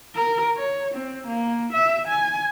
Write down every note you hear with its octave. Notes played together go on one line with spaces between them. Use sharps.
A#4
C#5
C4
A#3
E5
G#5